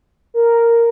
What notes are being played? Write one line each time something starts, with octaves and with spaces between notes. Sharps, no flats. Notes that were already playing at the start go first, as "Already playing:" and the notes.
A#4